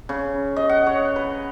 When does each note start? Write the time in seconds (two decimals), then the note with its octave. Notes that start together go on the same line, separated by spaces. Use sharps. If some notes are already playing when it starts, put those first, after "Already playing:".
0.09 C#3
0.56 D#5
0.69 F#5
0.87 C#5
1.16 B4